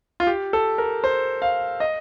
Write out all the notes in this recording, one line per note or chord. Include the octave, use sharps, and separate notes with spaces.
F4
G4
A4
A#4
C5
F5
D#5